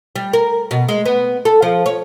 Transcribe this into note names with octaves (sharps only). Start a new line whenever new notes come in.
G3
A#4
B2
G#3
B3
A4
F3
C#5